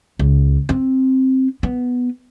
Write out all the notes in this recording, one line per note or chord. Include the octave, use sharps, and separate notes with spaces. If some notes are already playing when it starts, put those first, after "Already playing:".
C#2
C4
B3